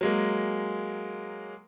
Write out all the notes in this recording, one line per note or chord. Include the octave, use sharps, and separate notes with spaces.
F#3 G#3 A#3